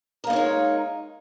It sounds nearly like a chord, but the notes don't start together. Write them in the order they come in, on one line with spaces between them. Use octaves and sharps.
A#4 A#3 D#4 C#5 G#3